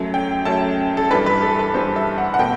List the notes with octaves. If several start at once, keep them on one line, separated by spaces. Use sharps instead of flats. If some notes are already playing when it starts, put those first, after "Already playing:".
Already playing: F#2 F#3 A3
G5
F#2 F#3 A3 A5
A4
G2 E3 G3 B4
B4
A4
B4
G2 E3 G3 C5
E5
F#5
F#5
B2 A3 G5